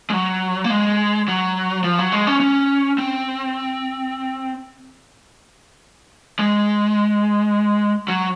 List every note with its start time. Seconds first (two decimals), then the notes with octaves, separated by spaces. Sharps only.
0.10 G#3
0.13 F#3
0.64 A#3
0.70 G#3
1.28 F#3
1.84 F3
1.98 F#3
2.12 G#3
2.27 C#4
2.40 C#4
2.98 C4
6.39 G#3
8.08 F#3